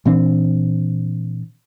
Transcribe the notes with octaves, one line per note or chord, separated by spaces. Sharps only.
A#2 E3 C4 D4